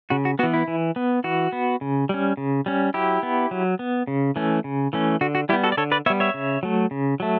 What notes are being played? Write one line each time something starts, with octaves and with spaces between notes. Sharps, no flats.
C#3 F#4
F#4
E3 B3 F#4
E4
E3
B3
E3 F#4
B3
C#3
G3 C#4
C#3
G3 C#4
F#3 E4 G4
B3
F#3
B3
C#3
E3 A3 C#4
C#3
E3 A3 C#4
D3 F#4
F#4
G3 B3 E4 G4
F#4 A4
D5
D3 A4 C#5
B4 D5
G3 B3 C#5 E5
C#5 E5
C#3
F#3 A3
C#3
F#3 A3